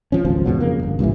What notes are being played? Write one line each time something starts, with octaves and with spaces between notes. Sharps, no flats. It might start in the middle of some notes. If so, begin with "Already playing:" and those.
F3 C#4
G#1 C#2 F#2 F3
E2 G#2 B2 F#3
F2 C#3 A#3
G1
C2 G2 A#2 E3